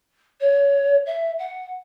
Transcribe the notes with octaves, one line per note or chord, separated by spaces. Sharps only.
C#5
E5
F#5